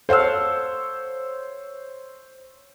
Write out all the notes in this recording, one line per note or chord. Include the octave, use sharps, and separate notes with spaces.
A4 C5 C#5 F5 F#5 E6